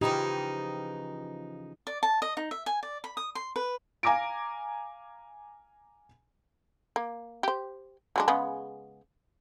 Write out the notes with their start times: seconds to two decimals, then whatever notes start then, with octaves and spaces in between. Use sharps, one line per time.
0.01 C#3 E3 F3 D#4 G4
1.87 D5
2.03 A5
2.22 D#5
2.37 D#4
2.51 E5
2.66 G#5
2.83 D5
3.04 B5
3.17 D#6
3.35 C6
3.56 B4
4.03 F5 G#5 A#5 D6 A#6 D7
6.96 A#3
7.43 G4 C5
8.16 F#3 G#3 D4
8.28 C#3 G#3 B3